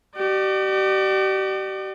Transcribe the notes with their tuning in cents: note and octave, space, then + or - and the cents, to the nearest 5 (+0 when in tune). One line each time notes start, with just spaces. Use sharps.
G4 -40 D5 +40